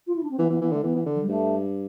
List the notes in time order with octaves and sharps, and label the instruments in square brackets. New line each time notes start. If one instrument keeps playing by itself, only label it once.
[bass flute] F4
E4
D4
C4
[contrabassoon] E3 [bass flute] B3
[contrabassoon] E3 [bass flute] B3
[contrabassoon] E3 [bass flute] B3
[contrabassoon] D3 [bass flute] A3
[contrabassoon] E3 [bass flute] B3
[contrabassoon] E3
D3
[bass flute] F3
G3
[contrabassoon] G2 [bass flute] A3